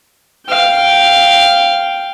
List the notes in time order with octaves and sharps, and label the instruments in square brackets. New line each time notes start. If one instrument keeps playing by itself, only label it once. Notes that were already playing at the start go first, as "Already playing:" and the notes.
[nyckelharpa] F5 G5